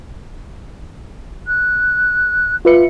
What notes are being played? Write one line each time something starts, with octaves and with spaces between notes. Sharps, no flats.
F#6
F4 B4 E5 C#7